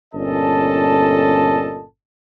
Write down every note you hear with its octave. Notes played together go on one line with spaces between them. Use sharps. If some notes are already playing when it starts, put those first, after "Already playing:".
G1 A#2 C#4 A4 D#5 A5